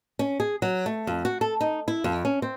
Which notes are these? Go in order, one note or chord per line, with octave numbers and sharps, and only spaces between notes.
C#4
G#4
F#3
A3
F2
F#4
A4
D#4
E4
F2
C#4
C4